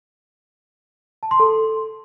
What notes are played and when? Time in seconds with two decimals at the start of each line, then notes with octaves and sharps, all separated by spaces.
1.23 A5
1.31 C6
1.40 A4